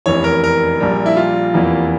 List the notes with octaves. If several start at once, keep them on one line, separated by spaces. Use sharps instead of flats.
F1 E2 E3 C#5
A#4
A#4
A#1 A#2 G3
E4
F4
F1 E2 E3 A#3